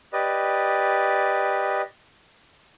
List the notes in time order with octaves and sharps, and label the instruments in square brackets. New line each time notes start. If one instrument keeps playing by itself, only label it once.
[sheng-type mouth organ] G4 B4 D5 D#5